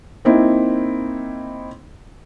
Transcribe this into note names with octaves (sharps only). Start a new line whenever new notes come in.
A#3 C4 D#4 E4